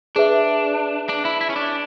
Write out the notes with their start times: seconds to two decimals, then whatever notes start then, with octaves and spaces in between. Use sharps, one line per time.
0.16 D4 G#4 B4 E5
1.09 D4
1.25 E4
1.41 E4
1.50 C#4
1.56 D4